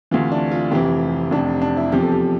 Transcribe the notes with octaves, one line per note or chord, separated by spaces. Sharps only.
D2 C3 E3 F4
D4
F4
F1 F2 E3 G4
F1 F2 C3 D4
D4
E4
E2 C3 F3 G4
A4
G4